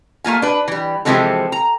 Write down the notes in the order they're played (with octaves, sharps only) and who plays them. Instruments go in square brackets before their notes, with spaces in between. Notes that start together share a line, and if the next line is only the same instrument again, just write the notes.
[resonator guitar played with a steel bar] A3 A#3 F4 G#5
D4 B4
E3 G3
C3 E3 F3 G#3 C4 A4
A#5